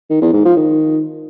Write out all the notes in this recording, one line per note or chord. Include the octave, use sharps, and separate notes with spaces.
D#3
E2
G#2
F3
D#3